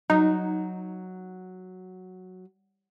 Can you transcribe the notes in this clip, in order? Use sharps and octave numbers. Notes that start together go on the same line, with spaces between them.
F#3 D#4